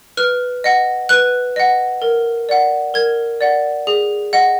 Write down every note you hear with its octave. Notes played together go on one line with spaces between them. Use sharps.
B4 F6
D#5 F#5
B4 F#6
D#5 F#5
A#4
D5 F#5
A#4 G#6
D5 F#5
G#4
D#5 F#5